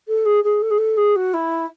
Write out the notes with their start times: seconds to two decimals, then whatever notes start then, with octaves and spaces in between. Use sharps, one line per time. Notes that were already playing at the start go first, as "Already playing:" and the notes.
0.08 A4
0.25 G#4
0.44 G#4
0.62 A4
0.71 G#4
0.78 A4
0.97 G#4
1.16 F#4
1.34 E4